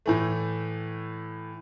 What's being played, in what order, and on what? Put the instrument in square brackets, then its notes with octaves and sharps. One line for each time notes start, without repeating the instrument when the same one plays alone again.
[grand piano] A2 E3 A3